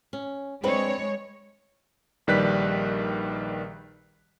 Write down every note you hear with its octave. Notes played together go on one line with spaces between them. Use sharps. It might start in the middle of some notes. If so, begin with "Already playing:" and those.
C#4
G#3 C4 D4 B4 C#5
A#1 D#3 G3 B4 F#6 B6